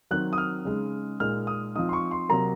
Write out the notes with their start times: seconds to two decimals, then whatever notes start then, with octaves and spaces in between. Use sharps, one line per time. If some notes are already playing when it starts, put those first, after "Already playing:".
0.11 D#3 F#3 C4 F#6
0.33 D#6
0.38 F6
0.65 C#3 G#3 D#4
1.20 A#2 G#3 D#4 F6
1.47 D#6
1.75 F3 C4 D#4 D#6
1.89 C6
1.93 C#6
2.11 C6
2.29 C3 F#3 A#3 A#5